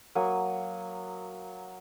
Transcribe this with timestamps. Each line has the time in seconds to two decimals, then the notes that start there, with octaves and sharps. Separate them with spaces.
0.15 F#3 A#3 G#5 D#6